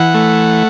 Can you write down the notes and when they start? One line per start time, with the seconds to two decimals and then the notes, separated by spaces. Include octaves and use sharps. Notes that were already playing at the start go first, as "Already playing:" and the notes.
Already playing: E3 F#5
0.14 A3